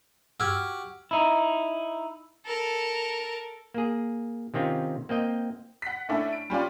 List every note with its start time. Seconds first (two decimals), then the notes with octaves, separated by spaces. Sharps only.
0.40 F#4 G4 E6 F6 G#6
1.11 D#4 E4
2.45 A4 A#4
3.74 A#3 G#4
4.54 C3 D#3 C4 C#4 F4
5.09 A#3 C4 D#5 G5
5.82 F#5 B6
6.09 A3 C#4 D4 E4
6.32 D7
6.50 G3 C#4 F4 D5